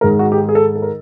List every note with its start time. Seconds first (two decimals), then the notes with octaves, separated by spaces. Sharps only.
0.01 G#2 D#3 G#3 A#4
0.19 F#4
0.32 G4
0.38 G#4
0.49 G#4
0.55 A4
0.75 A4
0.82 A#4